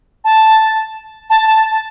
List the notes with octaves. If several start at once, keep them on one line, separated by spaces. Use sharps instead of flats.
A5
A5
A5